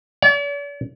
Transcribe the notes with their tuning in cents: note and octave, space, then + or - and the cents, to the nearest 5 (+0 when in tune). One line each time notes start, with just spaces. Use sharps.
D5 -45